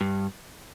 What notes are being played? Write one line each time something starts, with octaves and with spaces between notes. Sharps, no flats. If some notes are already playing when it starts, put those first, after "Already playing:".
G2